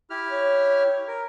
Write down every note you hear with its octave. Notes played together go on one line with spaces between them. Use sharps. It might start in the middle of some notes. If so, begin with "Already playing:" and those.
E4 G4 F6
C#5
A#4